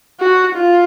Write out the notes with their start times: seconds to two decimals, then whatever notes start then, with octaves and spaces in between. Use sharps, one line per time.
0.20 F#4
0.55 F4